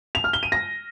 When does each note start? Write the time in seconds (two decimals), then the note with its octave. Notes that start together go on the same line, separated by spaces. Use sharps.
0.15 F7
0.24 F6
0.33 G7
0.43 D#7
0.52 A#6